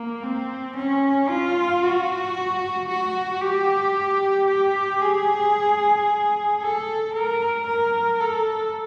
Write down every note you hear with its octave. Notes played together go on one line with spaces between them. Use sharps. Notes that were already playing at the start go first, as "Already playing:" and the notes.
Already playing: A#3
C4
C#4
F4
F#4
F#4
G4
G4
G#4
A4
A#4
A#4
A4